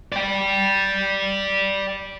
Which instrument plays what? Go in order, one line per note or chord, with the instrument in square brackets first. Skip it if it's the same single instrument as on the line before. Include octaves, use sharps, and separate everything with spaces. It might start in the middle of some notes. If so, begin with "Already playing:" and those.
[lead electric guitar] D5 G5